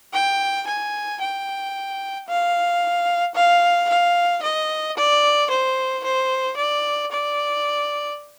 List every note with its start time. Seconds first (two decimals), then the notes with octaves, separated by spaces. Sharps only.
0.13 G5
0.68 G#5
1.21 G5
2.28 F5
3.35 F5
3.89 F5
4.42 D#5
4.97 D5
5.50 C5
6.04 C5
6.57 D5
7.11 D5